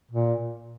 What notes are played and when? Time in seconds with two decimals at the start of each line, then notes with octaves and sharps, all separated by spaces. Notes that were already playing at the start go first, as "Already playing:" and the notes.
0.11 A#2